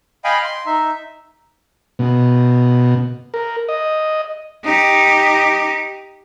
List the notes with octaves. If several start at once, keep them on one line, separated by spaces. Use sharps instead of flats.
D#5 F5 G5 G#5 B5
C6
D#4 E5
B2
A#4
D#5
D#4 G4